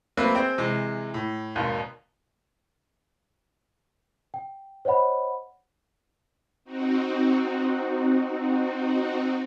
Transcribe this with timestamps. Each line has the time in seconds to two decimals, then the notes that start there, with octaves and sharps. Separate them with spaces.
0.17 F#3 A3 A#3 C4 B4 E5
0.35 C4 G#4 C5 G5
0.58 C3 E3 G#3
1.14 A2
1.55 G#1 D#2 G#2 B2
4.34 G5
4.85 C5 C#5 D#5 F#5 B5
6.65 C4 D#4 F#4